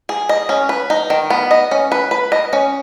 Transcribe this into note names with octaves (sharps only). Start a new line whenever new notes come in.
G#4
D#5
C#4
B4
D#4
D#3
B3
D#5
C#4
B4
B4
D#5
C#4